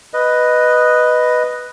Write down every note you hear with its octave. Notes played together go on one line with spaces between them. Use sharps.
B4 D#5